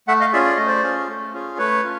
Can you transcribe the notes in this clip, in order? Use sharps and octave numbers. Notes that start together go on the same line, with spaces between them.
A3 E5 F#5
D#5 F5
C#4 F4 G#4 D5 E5
D5
A3 D#5
C5 D5
C#4 F4 G#4
A3
C#4 F4 G#4
A3 B4 C#5
C#4 F4